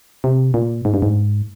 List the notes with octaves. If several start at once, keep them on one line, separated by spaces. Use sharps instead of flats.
C3
A#2
G#2
G2
G#2